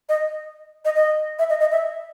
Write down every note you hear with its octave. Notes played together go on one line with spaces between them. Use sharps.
D#5
D#5
D#5
E5
D#5
D#5
E5